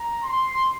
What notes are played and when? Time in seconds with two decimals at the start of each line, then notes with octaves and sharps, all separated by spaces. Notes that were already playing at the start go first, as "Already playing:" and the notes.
Already playing: A#5
0.25 C6